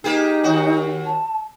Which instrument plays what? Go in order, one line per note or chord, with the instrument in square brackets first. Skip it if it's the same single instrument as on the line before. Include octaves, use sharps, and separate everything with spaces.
[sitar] A#3 G4 G#4 [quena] D#4
[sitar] D#2 F#4
[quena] A5